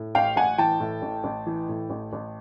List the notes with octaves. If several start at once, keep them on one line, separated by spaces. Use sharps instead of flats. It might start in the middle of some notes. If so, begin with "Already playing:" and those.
Already playing: A2
A1 F5 G5
A1 F#5 G#5
E3 G5 A5
A2
A1
A1
E3
A2
A1
A1